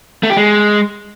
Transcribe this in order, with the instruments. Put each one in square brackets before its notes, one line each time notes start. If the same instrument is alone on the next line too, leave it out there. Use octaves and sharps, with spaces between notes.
[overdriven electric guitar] A3
G4
G#3